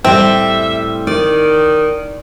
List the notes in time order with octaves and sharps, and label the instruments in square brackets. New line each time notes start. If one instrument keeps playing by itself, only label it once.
[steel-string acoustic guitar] A2 G3 [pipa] C4 [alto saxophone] E5
[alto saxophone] D#3 [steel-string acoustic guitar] D5